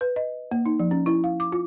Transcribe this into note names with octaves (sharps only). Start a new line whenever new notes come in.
B4
D#5
A#3
D#4
F3
C#4
E4
F5
D6
F4